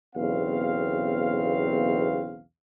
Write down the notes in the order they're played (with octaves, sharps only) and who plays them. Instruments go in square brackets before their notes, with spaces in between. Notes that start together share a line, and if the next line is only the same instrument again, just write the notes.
[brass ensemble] B1 E2 C#3 C4 F5